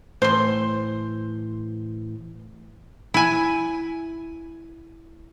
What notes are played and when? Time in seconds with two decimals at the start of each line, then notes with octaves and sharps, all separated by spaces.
0.22 A2 E3 C5 C6
3.14 E4 G#5